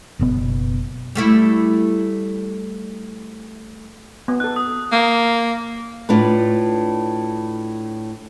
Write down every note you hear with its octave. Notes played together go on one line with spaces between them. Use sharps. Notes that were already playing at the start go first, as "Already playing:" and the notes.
F#1 B2 B3
G3 A3 E4
B3
D#4 A4 F#6
D#6
A#3
A2 D4 F4 B4